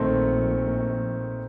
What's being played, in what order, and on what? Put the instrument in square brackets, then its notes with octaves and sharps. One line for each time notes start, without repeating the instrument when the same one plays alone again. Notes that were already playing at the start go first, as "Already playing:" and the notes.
Already playing: [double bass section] A#1 A#2 [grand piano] D#3 A3 C4